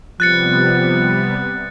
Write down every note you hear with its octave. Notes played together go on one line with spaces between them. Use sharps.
C3 F3 G3 B3 F#6 A6 C#7